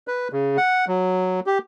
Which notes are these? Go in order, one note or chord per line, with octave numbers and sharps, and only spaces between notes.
B4
C#3
F#5
F#3
G4